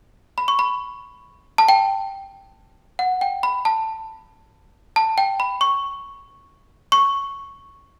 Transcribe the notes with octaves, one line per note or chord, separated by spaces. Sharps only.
B5
C#6
B5
A5
G5
F#5
G5
B5
A5
A5
G5
B5
C#6
C#6